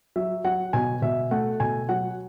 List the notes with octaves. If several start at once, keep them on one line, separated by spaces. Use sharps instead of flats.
F#3 E5
F#3 F#5
B2 G#5
B2 E5
A3 F#5
B2 G#5
F#3 F#5